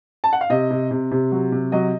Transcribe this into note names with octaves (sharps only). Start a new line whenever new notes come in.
A5
F#5
F5
C3 D#5
C3
C3
C3
F#3
C3
F#3 D#5